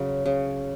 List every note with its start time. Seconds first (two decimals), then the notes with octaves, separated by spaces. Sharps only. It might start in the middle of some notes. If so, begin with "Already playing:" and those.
Already playing: C#3 F#3
0.26 C#3